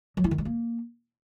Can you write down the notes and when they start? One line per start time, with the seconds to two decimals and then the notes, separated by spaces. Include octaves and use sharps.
0.17 F#3
0.24 E4
0.31 D#3
0.38 G#3
0.45 A#3